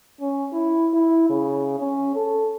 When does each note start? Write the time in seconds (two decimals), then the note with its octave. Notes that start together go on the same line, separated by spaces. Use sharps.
0.21 C#4
0.53 E4
0.93 E4
1.30 C#3
1.79 C#4
2.16 A4